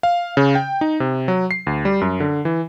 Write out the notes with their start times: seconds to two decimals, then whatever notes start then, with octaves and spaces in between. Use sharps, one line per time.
0.03 F5
0.37 C#3
0.55 G5
0.81 D#4
1.00 C3
1.28 F#3
1.51 C7
1.67 D2
1.85 G3
2.01 F#2
2.20 D3
2.45 E3